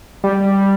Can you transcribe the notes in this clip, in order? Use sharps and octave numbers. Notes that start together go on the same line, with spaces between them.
G3